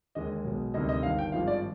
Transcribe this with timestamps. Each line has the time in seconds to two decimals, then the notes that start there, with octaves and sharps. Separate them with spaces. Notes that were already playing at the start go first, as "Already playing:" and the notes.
0.15 D#2 D3 G#3 D#5
0.44 B1 B2 G#3
0.74 D2 C3 D#3 G3 D#5
0.89 D#5
1.03 G1 G2 D#3 F5
1.18 G5
1.32 G#1 G2 F3 G#3 F5
1.47 D5